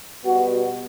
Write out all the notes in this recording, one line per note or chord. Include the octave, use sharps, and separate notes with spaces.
B2 G3 B3 F#4